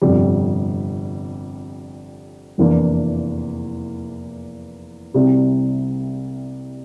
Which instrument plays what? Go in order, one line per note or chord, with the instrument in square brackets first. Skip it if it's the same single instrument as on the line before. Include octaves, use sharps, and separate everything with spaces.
[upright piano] G1 F2 C3 G3
F1 E2 E3 A#3 D4
C2 C3 G3 C4